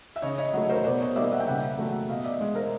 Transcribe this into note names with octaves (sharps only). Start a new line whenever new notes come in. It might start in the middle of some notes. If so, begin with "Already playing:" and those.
E5
C#3 C#5 D#5
C#5 D#5
F#3 A3
A#4 C5
B2 C5 D5
C#5 D#5
G3 A#3 D5 E5
E5 F#5
G5
C#3 E5 F#5
F#3 A3
B2 D#5 F5
D5 E5
G#3
A#4 C5